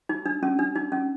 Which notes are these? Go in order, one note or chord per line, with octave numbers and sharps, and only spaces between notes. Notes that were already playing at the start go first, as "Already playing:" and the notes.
D#4
D4
C#4
D4
D#4
C#4